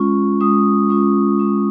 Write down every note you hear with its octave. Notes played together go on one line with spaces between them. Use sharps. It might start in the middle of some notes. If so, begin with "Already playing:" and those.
Already playing: G#3 C#4 F4 C#6
G#3 C#4 F4 D#6
G#3 C#4 F4 C#6
G#3 C#4 F4